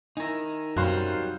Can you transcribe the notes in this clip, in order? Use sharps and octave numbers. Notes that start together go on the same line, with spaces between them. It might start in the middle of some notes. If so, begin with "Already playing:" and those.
D#4 E4 A#4 G#5
F#2 C3 F#3 G3 C5 F5 F#6